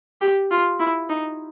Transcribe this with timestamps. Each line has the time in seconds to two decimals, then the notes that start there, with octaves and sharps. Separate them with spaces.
0.21 G4
0.51 F4
0.80 E4
1.10 D#4